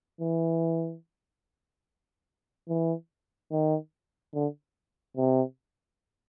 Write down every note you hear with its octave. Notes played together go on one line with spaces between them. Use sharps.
E3
E3
D#3
D3
C3